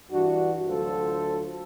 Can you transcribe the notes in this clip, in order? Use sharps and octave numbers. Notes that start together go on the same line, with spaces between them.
G2 E3 D4 F#4
D2 F#3 F4 A4 C5